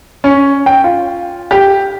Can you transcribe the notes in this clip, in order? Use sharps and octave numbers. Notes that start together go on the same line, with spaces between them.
C#4
G5
F4
G4